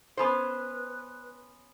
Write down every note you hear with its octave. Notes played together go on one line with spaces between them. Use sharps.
B3 C#4 B4 C5